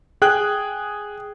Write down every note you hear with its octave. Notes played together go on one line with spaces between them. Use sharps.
G#4 G5 F#6